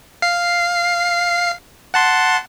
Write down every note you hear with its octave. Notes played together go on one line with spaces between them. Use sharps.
F5 C7
F#5 A5 C6